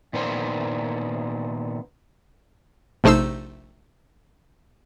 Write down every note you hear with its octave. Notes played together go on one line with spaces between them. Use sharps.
A#2 D#3 B3 D4 C5
A#1 C3 A3 D#4 C5 E6